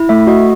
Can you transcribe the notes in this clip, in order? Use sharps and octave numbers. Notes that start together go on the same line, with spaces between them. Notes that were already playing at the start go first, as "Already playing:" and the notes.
Already playing: E4
A3 E5
F#4 D#5